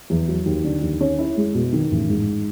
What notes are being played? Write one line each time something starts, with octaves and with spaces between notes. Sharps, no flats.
E2
F#3
D#2
D3
D#2
C#4
E4
G#3
B2
D#3
A1
G#2